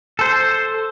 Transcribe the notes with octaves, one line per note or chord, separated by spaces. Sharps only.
A4 C5